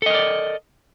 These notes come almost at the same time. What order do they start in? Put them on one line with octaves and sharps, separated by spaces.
A4 D#5 A#4 D5